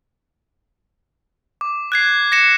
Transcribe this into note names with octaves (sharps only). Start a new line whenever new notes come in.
D6
F#6 G#6 C7
A#6 C#7 E7